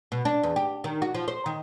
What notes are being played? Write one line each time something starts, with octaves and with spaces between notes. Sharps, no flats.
B2
D4
E2
G4
D#3
F#4
F3
C5
D#3